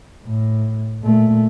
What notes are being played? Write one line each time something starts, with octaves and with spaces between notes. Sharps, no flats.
A2
A#2 A3